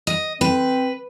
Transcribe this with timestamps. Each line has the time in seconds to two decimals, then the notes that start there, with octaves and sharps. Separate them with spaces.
0.07 D#5
0.41 C4 B4